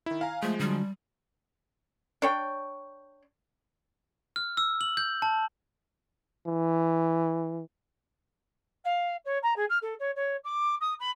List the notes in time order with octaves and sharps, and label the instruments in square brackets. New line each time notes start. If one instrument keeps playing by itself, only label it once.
[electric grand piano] D#3 E4
F5 G#5 A#5
[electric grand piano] F3 G#3 [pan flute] A3
[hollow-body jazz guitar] D3 F#3 [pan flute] G3
[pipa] D4 C#5 G5
[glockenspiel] F6
E6
F#7
G6
A5
[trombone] E3
[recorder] F5
C#5
A#5
G#4
F6
A4
C#5
C#5
D6
D#6
B5